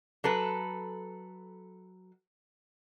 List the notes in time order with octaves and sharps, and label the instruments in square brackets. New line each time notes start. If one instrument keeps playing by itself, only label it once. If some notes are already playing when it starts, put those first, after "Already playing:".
[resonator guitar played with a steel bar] F#3 A4 B4